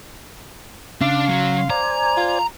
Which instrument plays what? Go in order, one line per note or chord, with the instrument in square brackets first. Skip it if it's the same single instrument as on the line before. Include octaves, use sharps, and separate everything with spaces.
[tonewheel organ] C#3 C6 [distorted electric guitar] D4 [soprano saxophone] F5
[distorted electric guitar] F#3
[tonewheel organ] C5 D5 G#5 [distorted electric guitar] A#5
[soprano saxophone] F4